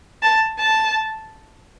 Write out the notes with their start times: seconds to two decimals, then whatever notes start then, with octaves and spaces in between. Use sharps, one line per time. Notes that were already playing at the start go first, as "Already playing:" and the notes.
0.23 A5
0.59 A5